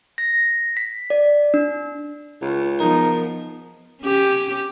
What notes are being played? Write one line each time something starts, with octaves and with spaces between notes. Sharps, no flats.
A#6
B6
D5
D4
C#2
F3 B3 D#4 A#4
C#4 G4